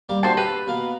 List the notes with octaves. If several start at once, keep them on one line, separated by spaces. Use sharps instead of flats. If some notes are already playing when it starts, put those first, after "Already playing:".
G3 A#3 D6
A#2 D4 F#4 C5 A5
G4 A4 B4
B2 A#3 F5